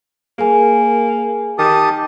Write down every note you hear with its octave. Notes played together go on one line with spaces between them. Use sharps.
A#3 G#4 A#4 G#5
D#3 G4 A5 D#6